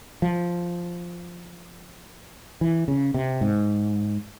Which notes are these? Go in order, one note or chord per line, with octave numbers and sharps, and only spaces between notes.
F3
E3
C#3
C3
G#2